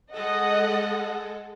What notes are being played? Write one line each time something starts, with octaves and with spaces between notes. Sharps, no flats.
G#3 G#4 A4 D#5 F#5